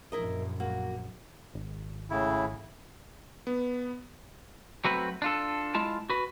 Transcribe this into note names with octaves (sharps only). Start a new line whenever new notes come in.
A#1 F#2 E4 A#4 D#5
A#3 F#4
G#1
A2 C#3 E4
B3
F#3 A3 C4 F#4 B4
D4 F4 A4
G#3 E4 F4 A5
F#4 B4